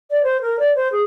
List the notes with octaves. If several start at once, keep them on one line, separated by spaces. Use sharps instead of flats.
D5
C5
A#4
D5
C5
G#4